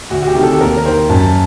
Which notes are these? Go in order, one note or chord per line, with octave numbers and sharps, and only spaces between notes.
D2 F#4
F#4
G4
C3 D#3
A4
D#2 A#4
A#4
D#3 C5
F#2 A5